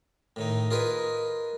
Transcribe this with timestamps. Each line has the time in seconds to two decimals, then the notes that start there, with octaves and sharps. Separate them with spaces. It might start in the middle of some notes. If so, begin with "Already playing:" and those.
0.36 A2 D#3 D#4
0.71 F4 G#4 A#4 B4 D#5